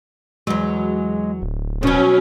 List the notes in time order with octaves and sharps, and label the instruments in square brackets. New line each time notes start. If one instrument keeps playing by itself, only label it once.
[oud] E2 F#3 [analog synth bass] G#3
[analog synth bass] D1
[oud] B2 F#3 [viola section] C#4